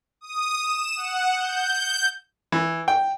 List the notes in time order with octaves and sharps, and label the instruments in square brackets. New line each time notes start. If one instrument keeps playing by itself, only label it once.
[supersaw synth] D#6
E7
F#5
G6
[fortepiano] E3
G5